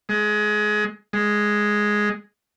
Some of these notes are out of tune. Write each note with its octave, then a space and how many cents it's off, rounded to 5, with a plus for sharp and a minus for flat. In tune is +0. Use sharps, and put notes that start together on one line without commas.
G#3 +20
G#3 +0